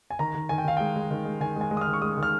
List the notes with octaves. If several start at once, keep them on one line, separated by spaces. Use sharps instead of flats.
G#5
D#3 A#5
D#3
D#3 G#5
G5
D#3 F5
G#3 G5
G#3
D#3
G#3
D#3 G#5
G#3 G#5
G#3
D#6
F6
D#3
C#6
G#3 D#6
D#3
F6